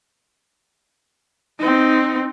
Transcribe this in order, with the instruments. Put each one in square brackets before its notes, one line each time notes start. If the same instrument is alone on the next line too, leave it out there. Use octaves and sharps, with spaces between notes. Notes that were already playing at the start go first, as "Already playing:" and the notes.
[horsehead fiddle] C4 D#4